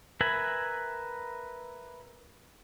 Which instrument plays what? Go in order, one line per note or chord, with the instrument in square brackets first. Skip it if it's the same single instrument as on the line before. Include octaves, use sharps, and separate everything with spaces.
[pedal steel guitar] A#4 B4 E5 G#5 B5